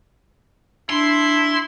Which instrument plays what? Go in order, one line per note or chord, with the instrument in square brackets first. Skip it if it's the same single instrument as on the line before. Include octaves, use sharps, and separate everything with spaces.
[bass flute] D4 [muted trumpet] E4 [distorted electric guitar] C6